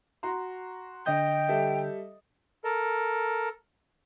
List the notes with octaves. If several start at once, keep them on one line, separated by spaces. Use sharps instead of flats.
F#4 A#5 C6
D3 D#5 G5 G6 A#6
G3 A4 E5
A4 A#4